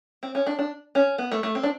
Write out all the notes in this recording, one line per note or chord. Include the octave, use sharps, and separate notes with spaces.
C4
C#4
D4
D4
C#4
B3
A3
A3
C4
D4